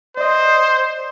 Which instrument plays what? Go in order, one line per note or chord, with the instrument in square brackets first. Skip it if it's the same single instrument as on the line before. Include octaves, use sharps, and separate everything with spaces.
[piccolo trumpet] C5 [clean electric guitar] D5 D#5